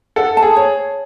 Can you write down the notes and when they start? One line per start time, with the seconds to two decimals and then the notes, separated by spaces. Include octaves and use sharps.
0.16 A4 F#5
0.37 A5
0.42 G#4
0.56 C#5